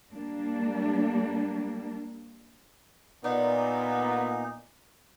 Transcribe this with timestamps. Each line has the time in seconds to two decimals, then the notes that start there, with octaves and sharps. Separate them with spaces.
0.13 G3 A#3 D4
3.24 A#2 B3 D4 D#4 D5 F#5